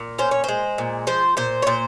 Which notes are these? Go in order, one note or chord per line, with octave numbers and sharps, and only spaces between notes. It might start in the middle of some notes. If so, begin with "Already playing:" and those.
Already playing: A#2
C#4 C5
C#5
G#3 C5
A#2
F3 C5
A#2 C5
C#5
A#2 C5